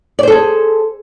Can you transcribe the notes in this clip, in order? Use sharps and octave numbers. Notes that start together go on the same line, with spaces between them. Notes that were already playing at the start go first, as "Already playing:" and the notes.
G#4 A4 C5 D5